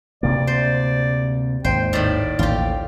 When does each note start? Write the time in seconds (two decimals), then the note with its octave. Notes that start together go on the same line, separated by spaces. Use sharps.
0.23 D2 C3 A#3 D5
0.47 C5
1.65 G#1 D#2 C5 G5
1.93 A2 D#3 D5
2.39 A1 D#2 F4 G4